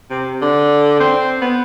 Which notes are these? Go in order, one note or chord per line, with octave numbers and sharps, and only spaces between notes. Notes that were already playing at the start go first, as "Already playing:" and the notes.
C3
D3
C4
B3